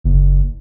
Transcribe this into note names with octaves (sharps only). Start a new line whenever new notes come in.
F#1